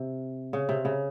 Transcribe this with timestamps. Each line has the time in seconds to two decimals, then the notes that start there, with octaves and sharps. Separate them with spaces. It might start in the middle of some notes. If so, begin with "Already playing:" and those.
Already playing: C3
0.53 C#3
0.69 C3
0.85 C#3